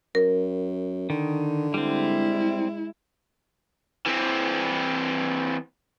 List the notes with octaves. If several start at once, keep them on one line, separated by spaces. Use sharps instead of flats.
F#2 A#4
D3 D#3
G3 G#3 C4 E4
E3 C4